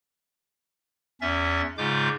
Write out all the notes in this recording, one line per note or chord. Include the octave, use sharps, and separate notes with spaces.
E2 C#4 E5 A6
G#2 C#3 G#3 F4 D6 G6